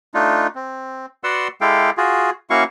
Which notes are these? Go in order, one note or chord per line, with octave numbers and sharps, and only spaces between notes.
A3 D4 D#4 F4
C4
F#4 B4 D5 F#5 C6 E6
G#3 E4 G4 A4 F5 G5
F4 F#4 G#4
A#3 C#4 E4 F#4 F5 C#6